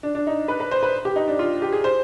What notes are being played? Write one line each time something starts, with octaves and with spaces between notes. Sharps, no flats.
D4
D4
D#4
B4
B4
C5
B4
G4
D#4
D4
F4
G4
G#4
C5